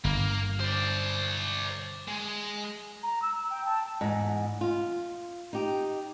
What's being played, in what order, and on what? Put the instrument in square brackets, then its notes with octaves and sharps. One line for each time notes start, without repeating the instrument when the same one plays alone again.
[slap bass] G1 [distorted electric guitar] A#3
[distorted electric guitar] C5 D5
G#3
[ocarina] A#5
E6
G5
A5
[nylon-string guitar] E2 G#2
F4
D#4 G4